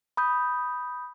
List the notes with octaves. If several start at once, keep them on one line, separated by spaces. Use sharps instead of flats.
B5 D#6 G6